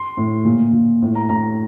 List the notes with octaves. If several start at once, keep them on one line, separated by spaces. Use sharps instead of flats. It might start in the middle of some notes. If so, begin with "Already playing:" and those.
Already playing: C6
A2
A#2
A#2
A2
A#5
A2 A#5